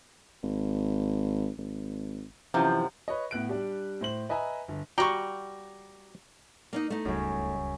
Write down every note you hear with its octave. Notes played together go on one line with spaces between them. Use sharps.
G#1
G#1
F#2 C3 E3 F3
B4 C#5 D#5
A2 B3 F#6 D7
G3 D4 G4
A2 C5 F#7
B4 D#5 E5 G#5 A#5
G1
G3 F#4 D5 G5 A#5 C#6
A#3 C#4 D#4
A3 D#4
D1 C#2 F#2 C#3 G3